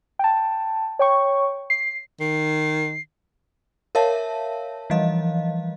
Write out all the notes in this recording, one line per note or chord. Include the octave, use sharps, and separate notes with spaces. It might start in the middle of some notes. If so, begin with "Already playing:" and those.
G5 A5
C#5 G5 C#6
C7
D#3 C7
A#4 C#5 E5 F5 A5
E3 F3 G3 D#5 F5